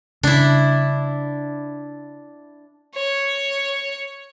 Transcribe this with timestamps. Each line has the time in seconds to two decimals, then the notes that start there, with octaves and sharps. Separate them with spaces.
0.23 C#3 G3 D4 E4
2.95 C#5